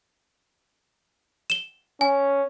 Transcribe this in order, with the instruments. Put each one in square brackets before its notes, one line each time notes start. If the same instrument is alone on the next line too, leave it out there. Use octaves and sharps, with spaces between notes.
[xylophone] E7 G7
[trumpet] C#4 [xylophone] G#5